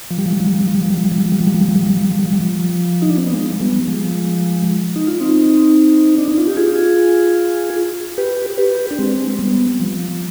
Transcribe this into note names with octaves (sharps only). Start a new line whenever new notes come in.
F3
G3
F3
G3
F3
G3
F3
G3
F3
G3
F3
G3
F3
G3
F3
G3
F3
G3
F3
G3
F3
G3
F3
G3
F3
G3
F3
G3
F3
G3
F3
G3
F3
D#4
D4
C4
B3
F3 G#3
G3 B3
F3 G#3
D#4
F4
C4 D#4
D4
D#4
F4
G4
F4 G#4
G4 B4
G4 B4
D4
G#3 C4
G3 B3
F3